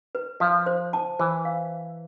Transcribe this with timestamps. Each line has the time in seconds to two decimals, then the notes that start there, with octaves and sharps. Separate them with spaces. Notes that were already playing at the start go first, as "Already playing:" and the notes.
0.15 B4
0.40 F3 F5
0.66 C5
0.93 A5
1.19 E3 C5
1.45 F5